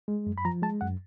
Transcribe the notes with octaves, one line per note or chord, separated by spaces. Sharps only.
G#3
F#2
B5
F3 A#5
G#3 A5
F#2 F#5